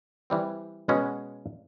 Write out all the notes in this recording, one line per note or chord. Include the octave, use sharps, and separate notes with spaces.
E3 G3 C4
B2 G#3 C#4 F#4